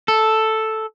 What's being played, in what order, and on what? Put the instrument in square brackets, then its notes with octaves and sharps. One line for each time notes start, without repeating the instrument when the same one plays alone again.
[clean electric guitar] A4